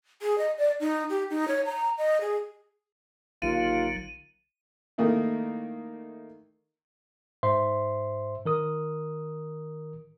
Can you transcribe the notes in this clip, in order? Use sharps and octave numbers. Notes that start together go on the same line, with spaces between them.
G#4
D#5
D5
D#4
G4
D#4
C#5
A#5
D#5
G#4
A#1 D#2 D3 F#3 F4 D#7
D#3 A3 A#3 D#4 E4
G#2 C5 E5 C6
D#3 A#4 D#6